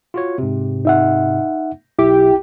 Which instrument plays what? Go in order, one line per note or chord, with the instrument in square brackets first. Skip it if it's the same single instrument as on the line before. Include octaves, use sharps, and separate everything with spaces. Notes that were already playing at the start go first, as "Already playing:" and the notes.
[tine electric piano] F4 F#4 C#5
G#2 C3
[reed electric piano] D#4 E5 F#5
[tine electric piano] B1 E5 D6 [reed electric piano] E4 [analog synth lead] G4